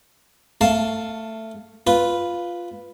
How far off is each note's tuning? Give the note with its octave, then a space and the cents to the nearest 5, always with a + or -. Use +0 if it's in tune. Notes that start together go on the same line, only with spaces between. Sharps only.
A3 +15 F5 +0 A5 -5
F4 +0 B4 +0